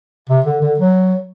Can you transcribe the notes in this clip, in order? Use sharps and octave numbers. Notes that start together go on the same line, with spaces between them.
C3
D3
D3
F#3